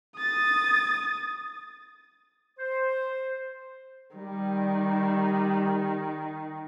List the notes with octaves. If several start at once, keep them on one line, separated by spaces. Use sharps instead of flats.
D#6 A6
C5
D#3 G3